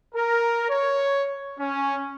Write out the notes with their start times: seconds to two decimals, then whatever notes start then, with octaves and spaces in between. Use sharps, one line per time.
0.15 A#4
0.69 C#5
1.60 C#4